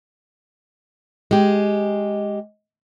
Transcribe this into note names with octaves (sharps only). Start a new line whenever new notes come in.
G#3 G4